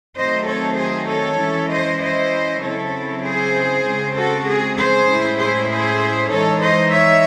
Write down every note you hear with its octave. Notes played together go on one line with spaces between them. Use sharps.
D#3 F#3 A3 C4 D#4 C5 D#5
A4 C#5
G#4 C5
A4 C#5
E3 G#3 C#4 E4
C5 D#5
C5 D#5
C#3 F#3 C4 E4 A4 C#5
G#4 C5
C#3 G#3 C4
F#4 A4
G#4
G#4 C5
A2 G#3 C#4 E4
G#4 C5
G#4 C5
E3 G#3 D#4 A4 C#5
C5 D#5
C#5 E5